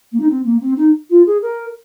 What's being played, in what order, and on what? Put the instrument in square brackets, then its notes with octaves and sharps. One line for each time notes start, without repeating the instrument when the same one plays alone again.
[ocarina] A#3
D#4
C4
A#3
C4
D#4
F4
G#4
A#4